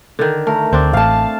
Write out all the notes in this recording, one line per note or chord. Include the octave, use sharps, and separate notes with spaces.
D3 D#3
A3 A#4
D2 C4 D4
A1 F5 A5